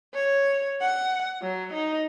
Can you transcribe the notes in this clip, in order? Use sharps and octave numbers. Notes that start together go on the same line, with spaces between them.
C#5
F#5
F#3
D#4